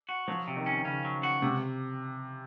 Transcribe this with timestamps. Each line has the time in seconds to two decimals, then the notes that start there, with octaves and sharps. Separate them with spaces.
0.09 F#4
0.28 F3 F#3
0.48 C3
0.57 D#3
0.66 C#4
0.85 C#3 C#4
1.05 F#3
1.23 F#4
1.42 C#2 C3